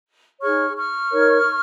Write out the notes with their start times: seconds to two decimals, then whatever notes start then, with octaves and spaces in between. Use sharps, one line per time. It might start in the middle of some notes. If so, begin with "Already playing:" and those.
0.40 D#4 G#4 C#5 C#6 F6
0.76 C#6 F6
1.12 D#4 A#4 C#5